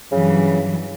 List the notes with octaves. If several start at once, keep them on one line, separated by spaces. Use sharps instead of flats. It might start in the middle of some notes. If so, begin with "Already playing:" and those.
G2 C#3 E3 F#3